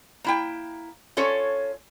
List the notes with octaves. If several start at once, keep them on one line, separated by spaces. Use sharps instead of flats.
A#3 E4 G5
C#4 F4 A4 C#5